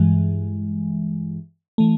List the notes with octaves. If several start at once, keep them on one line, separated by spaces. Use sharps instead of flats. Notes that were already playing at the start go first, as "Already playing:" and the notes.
Already playing: G2 E3 G#3
E3 A3